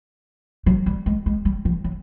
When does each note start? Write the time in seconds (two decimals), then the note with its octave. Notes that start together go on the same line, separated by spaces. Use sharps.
0.66 F#3
0.86 G3
1.06 G#3
1.26 G#3
1.45 G3
1.65 F3
1.84 F#3